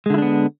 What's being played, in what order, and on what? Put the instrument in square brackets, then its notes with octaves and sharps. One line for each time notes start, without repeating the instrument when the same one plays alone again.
[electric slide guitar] G#3
D3
E4
D4
B3